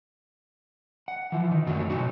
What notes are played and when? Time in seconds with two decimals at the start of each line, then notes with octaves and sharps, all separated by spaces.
1.08 F#5
1.32 E3 F3
1.51 D#3
1.66 F#2 A2 D3 F#3
1.90 B2 F#3 G#3 D#4 F#4